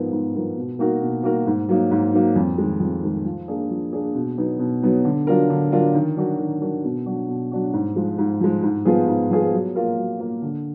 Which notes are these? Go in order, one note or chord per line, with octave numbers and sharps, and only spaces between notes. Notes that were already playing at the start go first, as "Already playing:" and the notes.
Already playing: G#2 F3 B3 D#4 A#4
G#2
F3 B3 D#4 A#4
B2
A#3 D#4 F#4 A#4
B2
A#3 D#4 F#4 A#4
G#2
F#3 A#3 D#4
G#2
F#3 A#3 D#4
F2
D#3 G#3
F2
D#3 G#3
F3
A#3 D4 G#4
F3
A#3 D4 G#4
B2
F#3 B3 D#4
B2
F#3 B3 D#4
D3
F#3 D4 F4 A#4
D3
F#3 D4 F4 A#4
D#3
F#3 D4 F#4 A#4
D#3
F#3 D4 F#4 A#4
B2
F#3 D4 F#4
B2
F#3 D4 F#4
G#2
F3 G#3
G#2
F3 G#3
G#2
F3 B3 F4 G#4
G#2
F3 B3 F4 G#4
F#3
A#3 F4 A#4
F#3
A#3 F4 A#4
D3